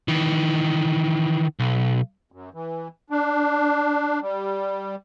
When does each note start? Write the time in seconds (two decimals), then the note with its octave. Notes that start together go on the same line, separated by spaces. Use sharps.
0.08 D#3 E3
1.59 B1
2.32 F#2
2.54 E3
3.10 D4
4.22 G3